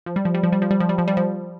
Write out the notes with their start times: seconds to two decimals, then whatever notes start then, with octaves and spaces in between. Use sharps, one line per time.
0.06 F3
0.16 G3
0.25 F3
0.34 G3
0.43 F3
0.53 G3
0.62 F3
0.71 G3
0.80 F3
0.89 G3
0.98 F3
1.08 G3
1.17 F3